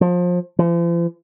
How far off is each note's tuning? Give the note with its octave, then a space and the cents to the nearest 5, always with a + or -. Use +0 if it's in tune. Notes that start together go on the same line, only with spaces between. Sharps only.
F3 +25
F3 -45